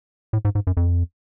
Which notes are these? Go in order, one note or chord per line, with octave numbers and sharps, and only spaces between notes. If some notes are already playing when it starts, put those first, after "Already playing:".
A2
G#2
G#2
F#2
F2